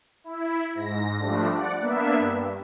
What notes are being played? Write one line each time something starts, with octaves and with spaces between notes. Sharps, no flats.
E4
G#2 A#6
F3 G3 A3 D4
D5 F#5
A#3 B3 D4 E5
G2